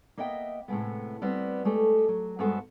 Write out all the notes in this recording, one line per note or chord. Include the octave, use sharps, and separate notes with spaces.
A#3 B3 D#5 E5 G5
A2 C3 G#3 B3
G3 B3 C4
G#3 A3 G4 A4
F#3
G2 G#3 B3 F#4 A4 C5